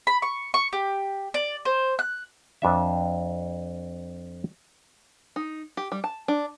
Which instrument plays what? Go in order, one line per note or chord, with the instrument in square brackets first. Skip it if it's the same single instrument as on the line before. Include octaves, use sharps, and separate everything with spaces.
[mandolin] B5
C#6
C#6
G4
D5
C5
F#6
[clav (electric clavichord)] F2 D4 E5
[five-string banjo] D#4
G4
G3
A5
D4